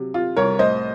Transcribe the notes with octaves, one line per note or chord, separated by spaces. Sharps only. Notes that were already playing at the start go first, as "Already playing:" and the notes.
Already playing: C3 F#3
C3 F4
C2 A#4 C#5
A2 C5 D#5